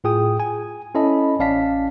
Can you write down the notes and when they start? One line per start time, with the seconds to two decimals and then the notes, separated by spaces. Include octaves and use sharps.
0.04 A2 F4 G#4 G5 D#6
0.40 G#5
0.95 C#4 E4 A4 D#5 A5 B5
1.39 A1 C#4 D5 F5 A5 B6